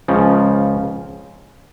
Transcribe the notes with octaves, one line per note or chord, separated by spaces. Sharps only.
C#2 C#3 F3